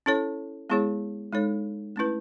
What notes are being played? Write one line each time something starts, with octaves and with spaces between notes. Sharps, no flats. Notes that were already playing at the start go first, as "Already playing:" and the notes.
C#4 E4 A4 C#5
G#3 B3 E4 G#4 C#5
G#3 D#4 A4 C#5
A3 C#4 E4 B4